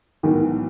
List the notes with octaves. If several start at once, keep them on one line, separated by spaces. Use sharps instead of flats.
B1 A2 D#3 E3 G#3 B3